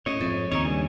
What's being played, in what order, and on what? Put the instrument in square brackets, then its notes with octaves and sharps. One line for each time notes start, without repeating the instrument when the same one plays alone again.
[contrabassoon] A1 [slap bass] A2 [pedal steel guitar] C#5 D#5
[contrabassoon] F2 [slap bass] G#2
[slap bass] D#2 C#3 [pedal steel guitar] D#4 C#5
[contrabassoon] G2 [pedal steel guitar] G#5